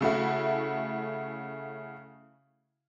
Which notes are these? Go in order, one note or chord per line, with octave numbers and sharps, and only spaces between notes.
C#3 A3 E4 F#4